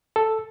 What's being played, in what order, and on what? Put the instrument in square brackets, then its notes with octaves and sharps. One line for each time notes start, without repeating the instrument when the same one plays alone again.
[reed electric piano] A4